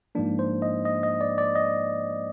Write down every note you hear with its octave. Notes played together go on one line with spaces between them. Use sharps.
G#2 F3 A#3 D4
C5
D#5
D#5
D#5
D5
D5
D#5